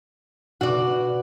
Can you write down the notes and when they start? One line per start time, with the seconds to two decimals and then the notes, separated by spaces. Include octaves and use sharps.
0.61 B2 F#4 D5